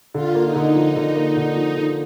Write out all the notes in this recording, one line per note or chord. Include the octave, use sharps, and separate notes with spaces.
D3 F4
A#3
D#4
D3
F3
D3
A#3
D3
F3
D3